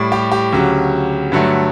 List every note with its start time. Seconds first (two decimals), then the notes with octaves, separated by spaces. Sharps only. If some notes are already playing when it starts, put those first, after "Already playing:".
Already playing: A2 G3
0.12 G4
0.32 G4
0.53 D2 C#3 F#3
1.32 G2 D3 F#3 A3